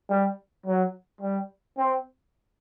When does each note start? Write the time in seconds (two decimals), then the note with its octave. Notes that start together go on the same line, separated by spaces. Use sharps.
0.10 G3
0.66 F#3
1.21 G3
1.78 C4